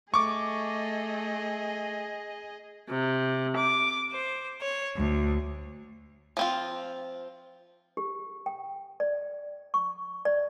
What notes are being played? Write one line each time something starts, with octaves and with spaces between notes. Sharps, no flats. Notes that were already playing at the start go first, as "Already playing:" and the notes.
A3 G#4 D#5 C#6 D6
C3
D6
C5
C#5
D2
F3 C4 F4
G4
G5
D5
C#6
D5